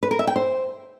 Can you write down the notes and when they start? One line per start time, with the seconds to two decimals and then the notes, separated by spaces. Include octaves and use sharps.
0.03 B4
0.11 A#4
0.19 E5
0.27 G5
0.36 C5